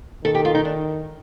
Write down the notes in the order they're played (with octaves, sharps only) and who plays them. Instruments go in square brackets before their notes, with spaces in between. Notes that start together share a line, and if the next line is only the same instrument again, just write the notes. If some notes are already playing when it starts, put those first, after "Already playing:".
[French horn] D#3 [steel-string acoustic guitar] A4
[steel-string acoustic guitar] G4
F4
D#4
D4